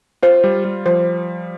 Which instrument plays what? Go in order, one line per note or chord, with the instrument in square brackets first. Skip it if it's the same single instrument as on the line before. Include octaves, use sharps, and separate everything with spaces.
[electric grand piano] F4 [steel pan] C5
[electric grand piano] G3
G3
[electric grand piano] F3 [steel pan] C5